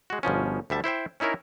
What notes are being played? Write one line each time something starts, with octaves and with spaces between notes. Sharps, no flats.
G#3 F#4
G1 B2 F3 C#4
D2 G3 E5 A5
E4 C5 E5 G5
C#4 D#4 E4 A#4 C#5